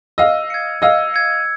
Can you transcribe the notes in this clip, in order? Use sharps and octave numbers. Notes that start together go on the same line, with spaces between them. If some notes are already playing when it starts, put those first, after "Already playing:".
D#5 F5 E6
G#6 C#7
D#5 F5 E6
G#6 C#7